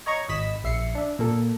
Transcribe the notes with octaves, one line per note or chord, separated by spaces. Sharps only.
C#5 D#5 A#5 C#6 G#6
G#1 D#5 B5 B6 E7
A#1 E5 C7 C#7
D4 E5
A#2 A#3 A4